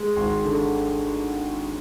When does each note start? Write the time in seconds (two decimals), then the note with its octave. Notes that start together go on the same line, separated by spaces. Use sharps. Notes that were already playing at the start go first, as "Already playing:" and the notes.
Already playing: G#3
0.16 G#1 C6
0.45 D3